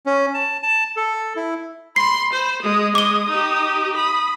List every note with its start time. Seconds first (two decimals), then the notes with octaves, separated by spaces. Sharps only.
0.06 C#4
0.34 A5
0.63 A5
0.96 A4
1.36 E4
1.96 B5 C6 C7
2.33 C5 B5
2.62 G#3 D#6
2.95 G#3 D6 D#6 G7
3.29 D#4 G4
3.96 B5 D#6